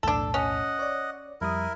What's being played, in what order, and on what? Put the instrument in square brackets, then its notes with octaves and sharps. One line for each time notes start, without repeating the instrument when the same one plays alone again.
[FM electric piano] B1 E2 A2 [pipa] D4 A4
[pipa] C#4 [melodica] D#5 F#5
[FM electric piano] C#5 D5
[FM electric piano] F2 G3 D#6 [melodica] E4 A#4